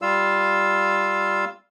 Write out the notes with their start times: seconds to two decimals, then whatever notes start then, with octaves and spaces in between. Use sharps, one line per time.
0.02 G3 F4 F5 E6